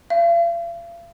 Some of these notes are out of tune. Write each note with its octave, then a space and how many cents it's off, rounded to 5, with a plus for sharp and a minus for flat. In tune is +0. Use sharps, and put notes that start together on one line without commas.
F5 -40